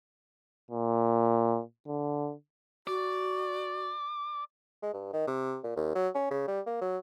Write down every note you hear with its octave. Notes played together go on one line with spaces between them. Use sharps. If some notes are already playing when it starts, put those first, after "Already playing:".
A#2
D3
F#4 D5
G#3
G2
D#3
C3
A#2
D#2
F#3
C#4
C#3
G3
A#3
F#3